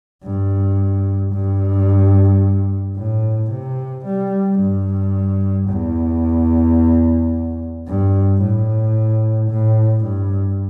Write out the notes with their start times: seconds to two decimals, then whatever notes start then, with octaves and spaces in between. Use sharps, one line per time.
0.24 G2
1.33 G2
2.97 A2
3.51 C3
4.05 G3
4.60 G2
5.69 E2
7.87 G2
8.42 A2
9.50 A2
10.05 G2